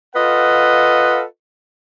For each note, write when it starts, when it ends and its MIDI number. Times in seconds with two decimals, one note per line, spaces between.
0.16 1.23 65
0.16 1.23 69
0.16 1.23 71
0.16 1.23 75
0.16 1.23 77
0.16 1.23 78